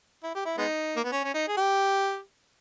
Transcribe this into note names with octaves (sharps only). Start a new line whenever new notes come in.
E4
G4
E4
G#3 B3 D#4
A#3
B3
C#4
C#4
D#4
G#4
G4